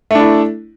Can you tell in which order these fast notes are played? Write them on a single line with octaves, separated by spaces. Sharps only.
A3 D4 E4